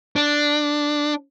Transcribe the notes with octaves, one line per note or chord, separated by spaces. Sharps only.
D4